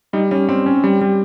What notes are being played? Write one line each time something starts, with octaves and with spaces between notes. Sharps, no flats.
G3 D#4
G3 C#4
G3 C4
C#4
G3
G3